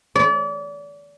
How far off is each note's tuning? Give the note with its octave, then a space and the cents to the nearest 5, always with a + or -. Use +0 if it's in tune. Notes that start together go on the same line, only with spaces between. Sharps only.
D5 -35